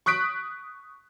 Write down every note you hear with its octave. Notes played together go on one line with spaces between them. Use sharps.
C#6 D#6 F#6 B6 D7